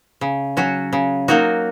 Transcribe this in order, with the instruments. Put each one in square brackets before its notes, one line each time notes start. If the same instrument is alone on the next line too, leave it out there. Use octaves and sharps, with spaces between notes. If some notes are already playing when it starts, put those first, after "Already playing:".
[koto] C#3
F#3 C#4 F#4
C#3
F#3 A#3 D#4 F#4